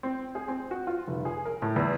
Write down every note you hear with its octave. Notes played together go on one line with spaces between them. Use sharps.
C4
G#4
C4
F#4
F4
F1
G#4
A#4
A2
E2